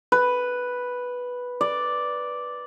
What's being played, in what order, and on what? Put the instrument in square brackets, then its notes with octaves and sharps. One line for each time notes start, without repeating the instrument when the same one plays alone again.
[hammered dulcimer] B4
D5